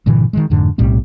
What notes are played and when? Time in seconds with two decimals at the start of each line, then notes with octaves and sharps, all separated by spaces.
0.06 G2 A#2 D3 E3
0.33 D#3 E3 G#3
0.50 F2 G#2 D3
0.78 B1 A2 G3 C4